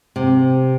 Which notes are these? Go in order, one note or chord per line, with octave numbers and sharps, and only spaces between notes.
C3